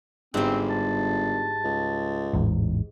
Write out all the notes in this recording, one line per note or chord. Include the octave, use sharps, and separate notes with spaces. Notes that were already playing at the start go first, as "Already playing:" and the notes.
G1 G#2 G3 C4
A5
C#2
A1 E2 G#2